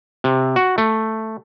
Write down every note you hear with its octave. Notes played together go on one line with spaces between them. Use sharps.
C3
F#4
A3